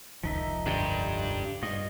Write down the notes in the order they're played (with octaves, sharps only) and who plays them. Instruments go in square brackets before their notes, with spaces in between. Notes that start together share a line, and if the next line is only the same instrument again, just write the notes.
[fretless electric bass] F1 C#2 D#3 [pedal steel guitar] F3 D#4 E5
[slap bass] G2 D3 [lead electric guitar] D4 G4
[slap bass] G2 [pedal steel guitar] F4 D#5